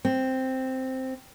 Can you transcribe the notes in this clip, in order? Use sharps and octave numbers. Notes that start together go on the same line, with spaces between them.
C4